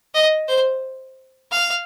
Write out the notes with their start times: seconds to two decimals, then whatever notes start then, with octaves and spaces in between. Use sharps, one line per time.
0.14 D#5
0.48 C5
1.52 F5